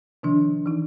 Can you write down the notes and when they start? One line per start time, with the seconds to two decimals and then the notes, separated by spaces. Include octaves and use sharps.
0.23 C3 D#3 F3 D4
0.66 E3 D#4